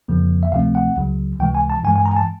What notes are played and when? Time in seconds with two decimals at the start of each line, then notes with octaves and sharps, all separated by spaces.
0.08 F2 C#3 F3 A#3
0.43 E5
0.52 D2 C3 F3 A3 C4 F5
0.75 F#5
0.96 C#2 C#3 F#3
1.40 C#2 C3 E3 G#3 G5
1.55 G#5
1.70 A5
1.84 G2 E3 G#3 G#5
1.96 G#5
2.06 A#5
2.11 G#5
2.17 A5